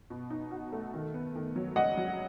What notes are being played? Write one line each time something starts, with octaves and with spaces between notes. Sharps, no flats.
B2
D#4
F#4
A3
D#3
B3
D#3
F#3
C#2 D#5 F#5
F#3